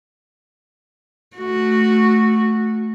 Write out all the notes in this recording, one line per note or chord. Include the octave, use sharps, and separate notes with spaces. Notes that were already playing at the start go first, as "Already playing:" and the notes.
A3 F#4